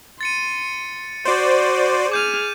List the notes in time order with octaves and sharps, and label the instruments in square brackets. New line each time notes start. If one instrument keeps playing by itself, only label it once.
[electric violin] C6 [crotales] A6 C#7 D#7
[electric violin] F#4 [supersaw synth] C5 D5
[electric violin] G#4 F6 [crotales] D6 G6 D#7